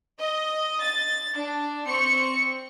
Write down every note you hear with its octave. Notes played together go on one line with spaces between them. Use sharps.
D#5
A6
D4
C4 C#6 C#7